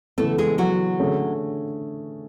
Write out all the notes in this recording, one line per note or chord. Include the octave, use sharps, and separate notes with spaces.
C#3 E3 A3 B3 A4
G#3 G#4
F#3 F#4
D3 A3 C#4 G#4